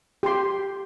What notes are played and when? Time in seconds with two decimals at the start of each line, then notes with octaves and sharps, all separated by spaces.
0.23 G4 C6